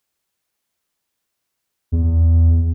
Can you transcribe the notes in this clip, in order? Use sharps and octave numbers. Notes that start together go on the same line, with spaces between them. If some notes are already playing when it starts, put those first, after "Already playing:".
E2